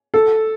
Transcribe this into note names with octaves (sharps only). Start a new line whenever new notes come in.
A4